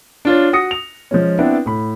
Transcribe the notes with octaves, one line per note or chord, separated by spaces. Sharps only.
D4 F4 C#5
F#4 D#6 A#6 C#7
F7
F3 G#3 C#4
B3 C4 D4 E4 B4
A2 B5